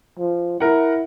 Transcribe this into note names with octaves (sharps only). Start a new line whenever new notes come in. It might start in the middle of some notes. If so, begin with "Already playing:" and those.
F3
E4 A#4 F#5